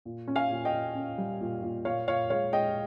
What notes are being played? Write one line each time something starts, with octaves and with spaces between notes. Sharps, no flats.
A#2
C#4
F5 G#5
A#2
D#5 G5
A#2
C#4
G3
A#2
A#2
A#2 C#5 F5
A#2 C#5 F5
G#3 C#5 F5
G#3 D#5 G5